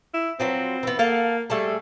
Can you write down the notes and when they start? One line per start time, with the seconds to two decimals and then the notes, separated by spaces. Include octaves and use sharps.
0.14 E4
0.40 F3 F#3 C4 B4
0.83 E3 B3
0.99 A#3 A4 F5 F#5
1.50 G3 A3 G#4 A4